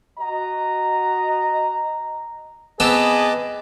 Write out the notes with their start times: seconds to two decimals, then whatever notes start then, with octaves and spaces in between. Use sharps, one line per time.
0.19 F#4 D#5 A#5
2.80 B3 C4 G#4 A4 B4 D#5 A5 D6